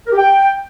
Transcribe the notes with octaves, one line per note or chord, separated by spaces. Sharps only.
A#4
G4
G5